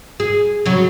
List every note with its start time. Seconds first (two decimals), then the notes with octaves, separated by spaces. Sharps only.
0.20 G#4
0.66 C#3 F#3